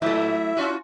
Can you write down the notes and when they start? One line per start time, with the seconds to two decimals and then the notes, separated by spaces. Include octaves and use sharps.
0.02 A2 F#3 A3 E4 E5
0.57 C#4 F4 F#4